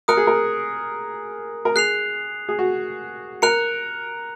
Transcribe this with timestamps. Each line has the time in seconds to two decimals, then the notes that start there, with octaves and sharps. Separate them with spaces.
0.08 A#4 D#6 F#6 C#7
0.17 G#4
0.27 A#4
1.65 A#4
1.75 G#4 F#6 C7 F7
2.49 G#4
2.59 F#4
3.42 A#4 F#6 C#7 F7